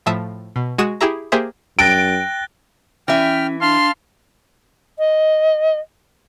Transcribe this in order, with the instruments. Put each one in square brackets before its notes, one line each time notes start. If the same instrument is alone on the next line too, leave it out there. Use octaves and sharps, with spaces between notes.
[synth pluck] A2 F3 E5 A5 D#6
B2
G#3 F#4 D#6 D#7 E7
E4 G4 G#4 E5 A#5
A#3 G4 G#4 C5 E5
[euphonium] F#2 [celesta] G5 A#6 [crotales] F#6 A6 G7 [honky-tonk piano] D7
[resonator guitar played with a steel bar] E3 E5 [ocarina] C#4 [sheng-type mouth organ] G5 F6
[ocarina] D4 [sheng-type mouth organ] F5 A5 F6 [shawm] C6
[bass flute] D#5